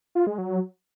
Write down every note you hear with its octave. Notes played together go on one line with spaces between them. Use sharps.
F4
G#3
F#3